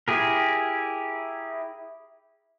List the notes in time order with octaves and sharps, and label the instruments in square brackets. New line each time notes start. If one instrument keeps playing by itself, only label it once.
[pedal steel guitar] E4 G4 G#4 A#4